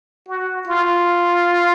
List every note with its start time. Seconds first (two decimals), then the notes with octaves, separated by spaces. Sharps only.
0.29 F#4
0.68 F4